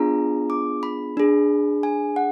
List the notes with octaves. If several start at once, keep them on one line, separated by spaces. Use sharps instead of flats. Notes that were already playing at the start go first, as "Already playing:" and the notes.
Already playing: B3 D4 F4 G#4 A#5
D6
B5
D4 G#4
G#5
F#5